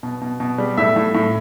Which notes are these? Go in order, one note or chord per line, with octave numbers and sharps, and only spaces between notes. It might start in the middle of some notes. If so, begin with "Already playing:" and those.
B2
B2
B2
G3
A2 E5
A2
A2